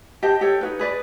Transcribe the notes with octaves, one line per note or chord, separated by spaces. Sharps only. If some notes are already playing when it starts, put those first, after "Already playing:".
G4 C5 D#5 A5
G4 A4 C#5
D#4 F#4 B4
G#4 B4 D5